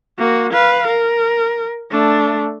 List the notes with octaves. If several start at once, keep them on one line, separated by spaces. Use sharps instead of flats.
A#3 F#4
B4 F5
A#4
A3 D4